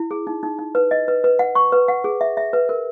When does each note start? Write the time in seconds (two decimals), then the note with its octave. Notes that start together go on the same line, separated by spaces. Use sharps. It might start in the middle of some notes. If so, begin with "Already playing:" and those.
Already playing: E4
0.11 G#4
0.27 D#4
0.43 D#4
0.59 D#4
0.75 B4
0.91 D#5
1.08 B4
1.24 B4
1.39 F#5
1.55 C#6
1.72 B4
1.88 F#5
2.04 G#4
2.21 E5
2.37 E5
2.53 B4
2.69 A#4